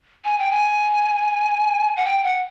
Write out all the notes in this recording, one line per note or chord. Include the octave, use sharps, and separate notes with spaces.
G#5
G5
G#5
F#5
G5
F#5